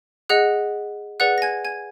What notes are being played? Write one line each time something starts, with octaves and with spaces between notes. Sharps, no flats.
G#4 D#5 F#5 F#6
G#4 B4 D5 F#5 F#6
A#6
G#5 G#6
G#5 G#6